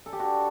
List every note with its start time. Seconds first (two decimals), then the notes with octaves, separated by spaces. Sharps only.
0.06 A4
0.13 G4
0.19 D4 F#4